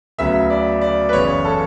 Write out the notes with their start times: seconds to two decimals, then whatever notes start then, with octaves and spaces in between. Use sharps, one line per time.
0.18 D2 C#3 F#3 B3 E5
0.50 D5
0.81 D5
1.09 B4
1.13 F#1 E2 C#3 C#5
1.45 A4